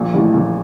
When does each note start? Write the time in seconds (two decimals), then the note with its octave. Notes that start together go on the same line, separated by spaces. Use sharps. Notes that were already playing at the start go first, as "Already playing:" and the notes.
Already playing: A#1 A#2
0.14 A1 A2
0.34 A#1 A#2